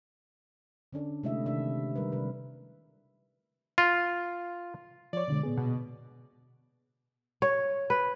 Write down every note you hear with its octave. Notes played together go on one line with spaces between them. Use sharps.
D3 C#4 D4 A4
C3 G#3 A3 E4 D#5 E5
C3 D#3 D4 E5
D#3 G3 A#4 B4
C3 B4
F4
F3 C#5 D5
B2 D3 G#3
A#2 B3 G#4
B2
C#5
B4